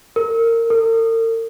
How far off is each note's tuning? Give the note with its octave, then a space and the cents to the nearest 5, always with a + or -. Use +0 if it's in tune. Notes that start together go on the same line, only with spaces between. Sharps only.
A#4 -20
A#4 -45